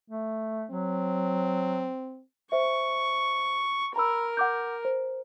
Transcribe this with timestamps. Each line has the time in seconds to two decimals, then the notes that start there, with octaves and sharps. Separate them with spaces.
0.10 A3
0.71 F#3 C4
2.52 C5 E5 C#6
3.96 A#4 A#5 B5 E6
4.37 F#5 D6 G6
4.85 C5